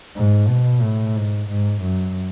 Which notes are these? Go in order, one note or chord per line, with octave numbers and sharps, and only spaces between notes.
G#2
B2
A2
G#2
G#2
F#2